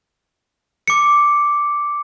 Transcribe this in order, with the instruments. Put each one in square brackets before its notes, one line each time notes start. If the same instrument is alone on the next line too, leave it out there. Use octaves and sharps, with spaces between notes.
[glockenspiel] D6 C#7